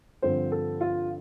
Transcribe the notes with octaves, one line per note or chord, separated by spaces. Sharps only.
G2 D3 F3 C4 C5
A4
F4